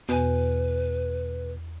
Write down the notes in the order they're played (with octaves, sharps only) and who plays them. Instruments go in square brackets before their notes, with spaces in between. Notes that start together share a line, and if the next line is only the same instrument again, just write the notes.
[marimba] E2 G#5 [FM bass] B2 [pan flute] B4